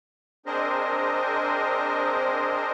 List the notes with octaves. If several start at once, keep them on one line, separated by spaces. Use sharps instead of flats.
C4 D4 G#4 A#4 C5 D#5